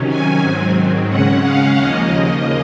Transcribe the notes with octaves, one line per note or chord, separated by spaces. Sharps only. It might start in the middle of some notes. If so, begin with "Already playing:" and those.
Already playing: C3 D#3 F#3 C#4
G#5
G#2 D#3 F#3 C4
C#3 G#3 C#4 F#5
F5
D#2 C#3 F3 A#3 D#5